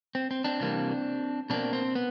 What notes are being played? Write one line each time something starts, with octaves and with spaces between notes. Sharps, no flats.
C4
C4
C4 D4
C3 E3 G3 A#3
B2 F#3 A#3 C4 D4
C4
B3